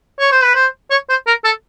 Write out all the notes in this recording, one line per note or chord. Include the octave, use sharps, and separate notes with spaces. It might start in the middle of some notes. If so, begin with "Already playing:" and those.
C#5
C5
B4
C5
C#5
C5
A#4
A4